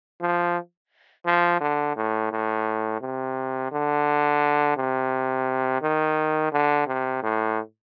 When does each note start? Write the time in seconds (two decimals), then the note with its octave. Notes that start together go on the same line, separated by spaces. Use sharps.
0.21 F3
1.26 F3
1.61 D3
1.96 A2
2.32 A2
3.02 C3
3.72 D3
4.77 C3
5.82 D#3
6.52 D3
6.87 C3
7.23 A2